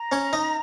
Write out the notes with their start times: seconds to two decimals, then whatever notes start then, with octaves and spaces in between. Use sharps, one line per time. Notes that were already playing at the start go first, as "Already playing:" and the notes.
Already playing: A#5
0.12 C#4 C#5
0.33 D#4 D#5